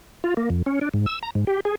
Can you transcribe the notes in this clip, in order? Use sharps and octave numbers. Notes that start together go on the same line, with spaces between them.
F4
A#3
F2
C#4
D4
G#2
E6
A#5
G#2
G4
G#4